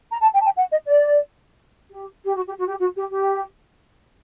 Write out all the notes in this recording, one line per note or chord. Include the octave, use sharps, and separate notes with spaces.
A#5
A5
G5
A5
G5
F#5
D#5
D5
G4
G4
F#4
G4
F#4
G4
F#4
G4
G4